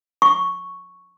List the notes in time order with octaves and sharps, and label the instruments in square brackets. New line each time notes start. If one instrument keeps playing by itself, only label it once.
[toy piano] C#6